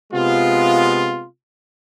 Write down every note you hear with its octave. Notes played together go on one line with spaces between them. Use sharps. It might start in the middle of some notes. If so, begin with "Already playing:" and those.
C3 G#3 B3 F4